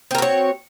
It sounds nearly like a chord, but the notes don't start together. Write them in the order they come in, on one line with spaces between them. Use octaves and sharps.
C4 A#4 F#4 C#5